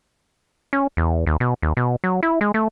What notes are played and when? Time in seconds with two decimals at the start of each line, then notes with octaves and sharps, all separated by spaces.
0.73 C#4
0.97 E2
1.27 D#2
1.40 B2
1.62 D#2
1.77 B2
2.04 F#3
2.23 E4
2.41 G#3
2.54 A3